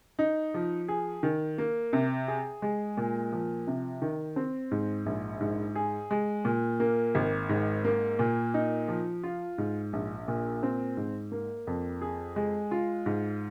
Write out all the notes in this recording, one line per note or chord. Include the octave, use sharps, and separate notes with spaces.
D#4
F3
G#4
D#3
A#3
C3
G#4
G#3
A#2
F3
C3
D#3
C4
G#2
A#1
G#2
G#4
G#3
A#2
A#3
G#1
G#2
A#3
A#2
D#4
F3
F4
G#2
A#1
A#2
C4
G#2
A#3
F2
G#4
G#3
F4
G#2